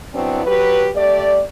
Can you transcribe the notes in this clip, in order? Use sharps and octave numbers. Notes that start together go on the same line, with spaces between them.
F#3 B3 C4 D4 E4
F#3 G4 B4
A3 G4 D5